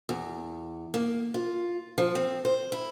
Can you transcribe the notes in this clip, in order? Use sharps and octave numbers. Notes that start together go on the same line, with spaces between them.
E2
A#3
F4
F3
C4
C5
E4